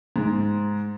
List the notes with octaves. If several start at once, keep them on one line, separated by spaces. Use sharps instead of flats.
G#2